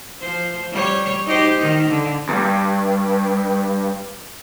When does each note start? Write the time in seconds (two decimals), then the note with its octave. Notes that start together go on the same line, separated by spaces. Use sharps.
0.20 F3 C5
0.72 G3 C#5
1.26 D#4 G4 C5
1.58 D#3 D#4
1.89 D3
2.29 E2 G2